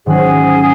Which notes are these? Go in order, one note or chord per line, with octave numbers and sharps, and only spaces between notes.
G#2 D#3 F#3 C#4 F#4 G#4